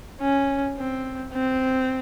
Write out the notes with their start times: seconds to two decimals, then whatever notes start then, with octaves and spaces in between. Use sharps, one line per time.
0.21 C#4
0.78 C4
1.33 C4